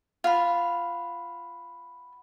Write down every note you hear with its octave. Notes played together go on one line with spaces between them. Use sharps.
F4 F#5 B5